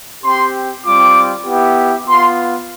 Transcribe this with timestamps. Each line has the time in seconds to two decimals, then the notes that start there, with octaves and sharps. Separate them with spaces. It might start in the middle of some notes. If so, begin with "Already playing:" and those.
0.24 C4 G4 C6
0.85 G3 C4 F4 D6
1.46 B3 E4 G4
2.07 B3 F4 C6